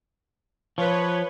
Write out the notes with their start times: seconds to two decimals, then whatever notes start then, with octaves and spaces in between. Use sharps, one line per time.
0.78 F3 B4 C#5